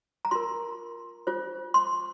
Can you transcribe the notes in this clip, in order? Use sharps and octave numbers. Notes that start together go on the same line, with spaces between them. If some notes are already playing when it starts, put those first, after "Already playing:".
A#5
F4 A#4 C6
F4 C5
C6